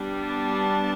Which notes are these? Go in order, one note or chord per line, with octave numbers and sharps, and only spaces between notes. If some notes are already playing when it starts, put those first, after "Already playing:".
Already playing: G3 B3 D4
A5